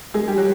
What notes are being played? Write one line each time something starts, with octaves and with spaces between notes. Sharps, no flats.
G#3 G#4
G3 G4
F#3 F#4